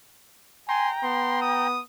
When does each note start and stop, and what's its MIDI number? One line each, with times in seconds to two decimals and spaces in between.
0.69 1.68 79
0.69 0.91 80
0.69 1.68 82
0.69 0.90 84
1.03 1.81 59
1.03 1.37 84
1.42 1.82 87